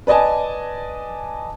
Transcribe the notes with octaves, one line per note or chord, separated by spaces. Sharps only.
B4 D5 D#5 G#5 A5